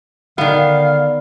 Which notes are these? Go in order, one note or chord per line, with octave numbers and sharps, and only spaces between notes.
D3 D#3 B3 D5 F5